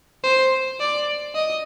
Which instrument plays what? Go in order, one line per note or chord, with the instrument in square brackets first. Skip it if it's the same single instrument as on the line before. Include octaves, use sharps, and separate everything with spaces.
[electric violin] C5
D5
D#5